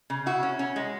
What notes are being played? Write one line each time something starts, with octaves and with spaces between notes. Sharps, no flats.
C#3
E4 F#4
C#4
C#4
G#3